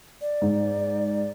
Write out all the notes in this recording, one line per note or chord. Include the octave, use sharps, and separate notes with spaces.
D5
G#2